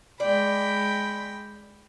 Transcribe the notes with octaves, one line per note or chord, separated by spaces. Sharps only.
G#3 D5 G5 B5